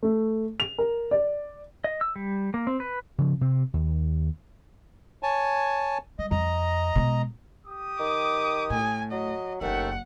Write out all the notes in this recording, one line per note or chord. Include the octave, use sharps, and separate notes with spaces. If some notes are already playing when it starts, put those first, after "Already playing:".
A3
F7
A#4
D5
D#5
E6
G3
A#3
C4
B4
C#3 F3
C3 C4
D#2
C#5 G#5 A5
G3 D#5
F2 D#5 A#5
B2 G#3
G4 D#6
D#3 D6
A2 G#5
F#3 D#5
F#1 D#2 A3 C#4 E5 F#5 G5